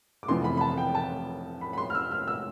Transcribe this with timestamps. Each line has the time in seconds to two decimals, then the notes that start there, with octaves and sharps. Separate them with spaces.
0.23 D6
0.28 F1 F2 E3 B3 C6
0.44 B5
0.57 B5
0.61 A5
0.78 G5
0.95 A5
1.61 B5
1.73 B5
1.78 C6
1.90 F6
1.95 E6
2.12 F6
2.28 E6